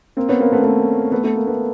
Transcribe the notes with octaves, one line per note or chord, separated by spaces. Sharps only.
A#3 C4
B3 C#4
A#3 C4
A3 B3
A3 B3
A3 B3
A3 B3
A#3
A3 B3